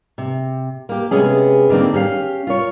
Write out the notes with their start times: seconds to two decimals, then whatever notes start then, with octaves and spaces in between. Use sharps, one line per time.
0.18 C3
0.89 A#3 G4
1.11 C3 G#3 B3 C#4 G#4
1.69 D3 D#3 A3 A#3 C4
1.93 C#4 G4 G#4 F5
2.47 F4 A#4 C#5